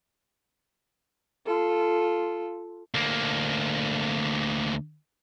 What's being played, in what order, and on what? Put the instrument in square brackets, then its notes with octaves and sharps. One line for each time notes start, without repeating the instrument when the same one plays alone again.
[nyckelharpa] F4 A4
[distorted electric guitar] D2 A#3